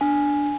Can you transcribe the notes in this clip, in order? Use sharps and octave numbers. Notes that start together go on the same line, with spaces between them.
D4 G#5